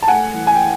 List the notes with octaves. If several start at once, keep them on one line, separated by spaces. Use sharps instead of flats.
A5
A3 F#5 G#5
E3
G#5
G5